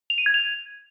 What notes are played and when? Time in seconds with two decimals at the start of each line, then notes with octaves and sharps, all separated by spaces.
0.10 F7
0.18 D#7
0.26 G#6
0.34 F7